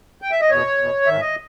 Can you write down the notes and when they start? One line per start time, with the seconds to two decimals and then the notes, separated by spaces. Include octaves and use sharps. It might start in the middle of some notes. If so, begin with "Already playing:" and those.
0.22 G5
0.31 E5
0.41 D#5
0.49 E2 B2 C#5
0.78 E2 B2
1.06 G#2 D#3 E5
1.21 D#5